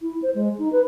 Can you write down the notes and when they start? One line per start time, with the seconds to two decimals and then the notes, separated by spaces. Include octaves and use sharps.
0.02 E4
0.22 C5
0.35 G#3
0.59 D#4
0.72 B4